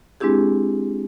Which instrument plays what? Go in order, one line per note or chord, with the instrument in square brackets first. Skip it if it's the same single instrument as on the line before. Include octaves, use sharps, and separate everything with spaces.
[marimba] G#3 C4 D4 E4 G4 G#4